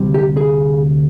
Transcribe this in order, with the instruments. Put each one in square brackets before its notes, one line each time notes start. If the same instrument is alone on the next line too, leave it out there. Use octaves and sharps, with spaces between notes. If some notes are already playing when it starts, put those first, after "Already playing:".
Already playing: [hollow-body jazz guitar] D2 C3 G3
G4
G#4